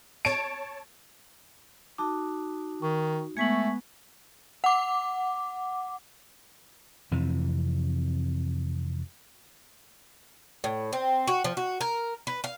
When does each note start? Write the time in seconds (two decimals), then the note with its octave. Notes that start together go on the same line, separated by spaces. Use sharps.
0.25 C#5 A5 D7
1.98 D#4 F#4 A5 D6
2.82 D#3 C#6
3.37 G#3 A3 B3 G#5 C#6 G#6 B6 F#7
4.64 F#5 D6
7.11 F2 C3 E3
10.64 A2
10.93 C4
11.27 F#4
11.44 F3
11.57 F#4
11.81 A#4
12.27 B4
12.44 F5